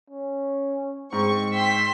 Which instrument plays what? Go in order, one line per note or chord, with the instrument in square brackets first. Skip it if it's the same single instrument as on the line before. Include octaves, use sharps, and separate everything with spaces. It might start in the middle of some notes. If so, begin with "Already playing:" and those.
[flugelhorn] C#4
[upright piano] G#2 [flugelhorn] C4 [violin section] C#6
[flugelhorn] G5 [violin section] C6 E6 B6